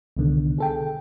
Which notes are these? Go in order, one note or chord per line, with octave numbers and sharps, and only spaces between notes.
C2 B2 D3 D#3
G#4 A4 G5